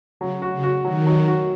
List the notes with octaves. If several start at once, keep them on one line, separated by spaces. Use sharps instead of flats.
C#3 F#3
F#4
C#3
F#4
D#3 F#3
F#3
F#4